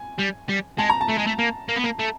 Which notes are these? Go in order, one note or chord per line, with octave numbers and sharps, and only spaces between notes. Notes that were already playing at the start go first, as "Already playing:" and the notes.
Already playing: G#5
G3
G3
G#3 A5
A#5
A5
A3
G#3
A3
A#3
A#3
B3
A#3
A3